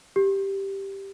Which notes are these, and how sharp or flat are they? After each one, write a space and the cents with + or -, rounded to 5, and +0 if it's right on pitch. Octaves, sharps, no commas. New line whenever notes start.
G4 +0